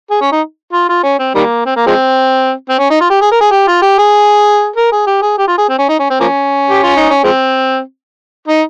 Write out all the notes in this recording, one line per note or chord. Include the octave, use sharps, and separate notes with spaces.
G#4
C#4
D#4
F4
F4
C#4
C4
D#3 G3 A#3
C4
A#3
F3 G#3 C4
C4
C#4
D#4
F4
G4
G#4
A#4
G#4
G4
F4
G4
G#4
A#4
G#4
G4
G#4
G4
F4
G#4
C4
C#4
D#4
C#4
C4
F3 A#3 C#4
G4
F4
D#4
C#4
F3 G#3 C4
D#4